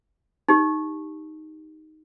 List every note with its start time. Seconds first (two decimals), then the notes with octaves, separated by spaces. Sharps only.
0.49 D#4 G4